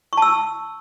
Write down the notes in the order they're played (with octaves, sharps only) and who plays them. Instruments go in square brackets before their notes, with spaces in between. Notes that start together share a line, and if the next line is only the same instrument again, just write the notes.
[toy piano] C#6
A5
E6